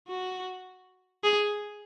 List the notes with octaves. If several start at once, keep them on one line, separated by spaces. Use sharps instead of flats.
F#4
G#4